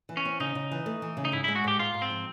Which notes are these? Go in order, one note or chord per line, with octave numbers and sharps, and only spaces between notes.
E3
C#4
C4
C#3 D#4
C#3
E3
A3
E3
C#3
D#4
G#2 E4
G#3 E4
F#4
G#2 G4
G#2 F4
G#2
C4
F3